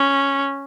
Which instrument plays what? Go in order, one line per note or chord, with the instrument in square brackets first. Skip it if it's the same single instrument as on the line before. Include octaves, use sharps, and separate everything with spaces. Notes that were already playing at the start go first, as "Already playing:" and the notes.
Already playing: [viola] C#4